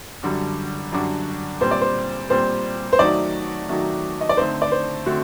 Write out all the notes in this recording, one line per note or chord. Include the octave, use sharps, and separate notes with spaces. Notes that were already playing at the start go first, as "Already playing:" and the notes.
F#2 D3 G3 D4 F#4
F#2 D3 G3 D4 F#4
A#2 G3 C4 C5
D5
C5
A#2 G3 C4 C5
C5
D#3 F#3 A3 D#4 F#4 D5
D#3 F#3 A3 D#4 F#4
D#5
D5
D3 A3 C4 D#4 C5
D5
C5
D3 A3 C4 F#4